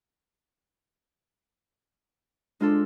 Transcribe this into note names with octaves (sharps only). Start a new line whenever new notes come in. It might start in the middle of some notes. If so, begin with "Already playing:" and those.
G#3 D4 F4 A4